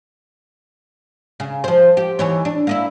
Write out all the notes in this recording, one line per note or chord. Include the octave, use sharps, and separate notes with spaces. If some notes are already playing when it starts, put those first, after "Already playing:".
C#3
F3 C5
G4
D#2 E3 C#5
D4
A#3 D#4 E4